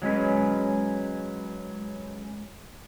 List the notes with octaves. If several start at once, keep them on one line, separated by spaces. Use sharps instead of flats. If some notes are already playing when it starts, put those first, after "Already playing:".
F#3 G#3 C#4 B4